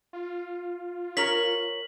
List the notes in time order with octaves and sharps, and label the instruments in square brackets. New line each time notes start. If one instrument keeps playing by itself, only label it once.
[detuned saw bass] F4
[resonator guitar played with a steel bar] A#4 C#5 [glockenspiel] B6 F#7